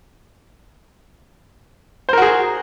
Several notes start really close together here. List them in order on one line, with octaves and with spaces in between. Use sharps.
C5 A#4 F#4 G#4